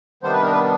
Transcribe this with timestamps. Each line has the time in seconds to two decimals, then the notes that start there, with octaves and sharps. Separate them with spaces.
0.23 C3 D#3 G3 B3 D4 C5
0.33 B4
0.43 A#4
0.52 B4